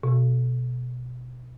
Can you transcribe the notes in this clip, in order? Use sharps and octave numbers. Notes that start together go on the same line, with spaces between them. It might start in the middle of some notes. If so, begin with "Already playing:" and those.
B2